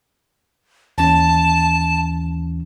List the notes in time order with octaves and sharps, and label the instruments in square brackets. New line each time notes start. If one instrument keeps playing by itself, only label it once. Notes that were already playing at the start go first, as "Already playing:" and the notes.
[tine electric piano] D#2 E3 C#4 [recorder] A5